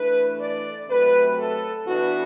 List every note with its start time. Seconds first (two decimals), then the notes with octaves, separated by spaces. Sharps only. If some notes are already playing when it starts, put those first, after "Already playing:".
Already playing: E3 A3 D4 B4
0.40 D5
0.89 C3 F#3 A3 B4
1.37 A4
1.86 E3 B3 D4 F#4